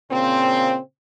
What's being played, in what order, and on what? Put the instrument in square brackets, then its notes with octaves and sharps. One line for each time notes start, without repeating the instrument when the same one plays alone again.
[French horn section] A#2 C#3 C4